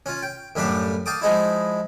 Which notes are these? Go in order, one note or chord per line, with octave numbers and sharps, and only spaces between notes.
C#4 F4
G5
F#2 A2 G3 D4 G4 F5
F5 G5 A5 D6 D#6
F3 G#3 D#4 E4